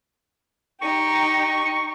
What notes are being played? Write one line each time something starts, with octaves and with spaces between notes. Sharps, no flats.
D#4 G4 C#6